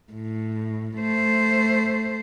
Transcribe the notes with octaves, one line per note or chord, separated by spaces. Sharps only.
A2
A3 C5